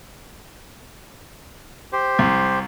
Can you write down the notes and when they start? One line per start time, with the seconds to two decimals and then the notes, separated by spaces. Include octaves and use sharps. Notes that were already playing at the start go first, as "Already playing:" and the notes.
1.93 G4 C5
2.19 C2